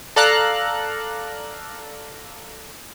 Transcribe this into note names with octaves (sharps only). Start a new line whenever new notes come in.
A4 D5 F5 A#5 F#6